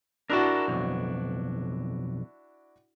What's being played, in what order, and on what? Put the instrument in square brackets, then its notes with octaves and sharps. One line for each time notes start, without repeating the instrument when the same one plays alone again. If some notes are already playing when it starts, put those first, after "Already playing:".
[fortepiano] D4 E4 F#4 [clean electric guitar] A#4 A5
[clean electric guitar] B1 F2